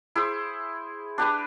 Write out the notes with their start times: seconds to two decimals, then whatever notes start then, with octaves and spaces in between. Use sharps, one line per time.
0.16 E4 G#4 C5
1.18 D4 G4 B4